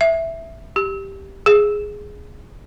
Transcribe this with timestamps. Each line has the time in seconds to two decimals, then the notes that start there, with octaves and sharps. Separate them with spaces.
0.01 E5
0.76 G4
1.46 G#4